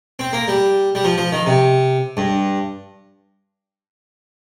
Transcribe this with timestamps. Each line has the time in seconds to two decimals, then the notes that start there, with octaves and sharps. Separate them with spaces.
0.19 C4
0.33 A#3
0.48 G3
0.95 G3
1.04 F3
1.18 F3
1.32 D#3
1.46 C3
2.17 G2